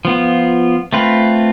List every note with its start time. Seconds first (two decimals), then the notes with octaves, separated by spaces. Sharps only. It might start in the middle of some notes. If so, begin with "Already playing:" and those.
0.05 F3 B3 F4
0.93 A3 C4 F4 B4